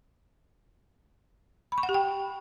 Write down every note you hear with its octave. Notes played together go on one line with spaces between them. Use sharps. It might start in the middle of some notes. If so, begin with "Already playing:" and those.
B5
C#6
F#5
G4
G5